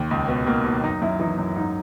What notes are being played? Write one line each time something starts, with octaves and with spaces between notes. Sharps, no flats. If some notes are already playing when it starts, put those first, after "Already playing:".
Already playing: D#2
C#2
B2 B3
B2 A#3
B2
F#2 D#4
F#2 E4
E3 D#4
F#2
G#2 D#4